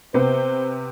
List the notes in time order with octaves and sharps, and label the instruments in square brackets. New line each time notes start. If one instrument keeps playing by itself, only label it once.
[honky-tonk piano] C3 B3 [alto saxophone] C5